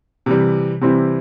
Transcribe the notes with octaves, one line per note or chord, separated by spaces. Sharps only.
C3 E3 G3
C3 E3 G3 C4 E4